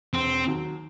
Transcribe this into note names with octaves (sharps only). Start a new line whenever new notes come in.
E1 C4
D#2 D#3 F#3